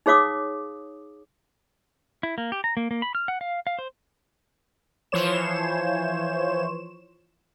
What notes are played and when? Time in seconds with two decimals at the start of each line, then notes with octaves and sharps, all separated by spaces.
0.06 D#4 G#4 C#5 F5 D6 D#6
2.23 E4
2.38 A#3
2.52 G4
2.64 A#5
2.77 A#3
2.91 A#3
3.02 B5
3.15 F6
3.28 F#5
3.41 F5
3.67 F5
3.79 C5
5.12 E3 F3 C5 C#5 E7